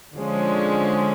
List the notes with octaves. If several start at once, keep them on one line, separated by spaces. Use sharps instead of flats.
D3 F3 G#3 C#4